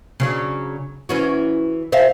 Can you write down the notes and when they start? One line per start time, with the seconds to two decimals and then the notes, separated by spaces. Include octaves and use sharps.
0.20 C#3 F#3 D4
1.09 E3 C#4 F#4
1.92 C5 E5 F5